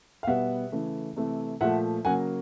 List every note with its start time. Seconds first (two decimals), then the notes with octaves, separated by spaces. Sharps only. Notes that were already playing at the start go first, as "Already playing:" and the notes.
0.23 F5
0.27 B2 G3 B3 E5 F#5
0.72 C#3 E3 A3
1.16 C3 E3 A3
1.60 A#2 F3 A3 E5 F#5
2.05 C#3 F#3 A#3 F#5 G#5